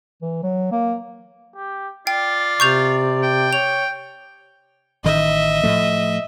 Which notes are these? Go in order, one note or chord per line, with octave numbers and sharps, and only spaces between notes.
E3
F#3
A#3
G4
F4 D5 G5
C3 C#6 G6 F7
G5
C#5 F7
A1 D#3 D#5 E5
A2 F3 A3